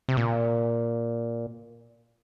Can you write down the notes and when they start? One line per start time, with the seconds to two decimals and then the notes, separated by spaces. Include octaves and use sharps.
0.09 C3
0.17 A#2